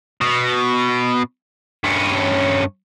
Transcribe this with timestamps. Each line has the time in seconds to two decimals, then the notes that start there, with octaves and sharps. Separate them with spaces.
0.21 B2
1.84 G2 C#4